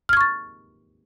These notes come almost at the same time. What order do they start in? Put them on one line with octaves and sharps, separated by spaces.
F6 G#6 C#6 A6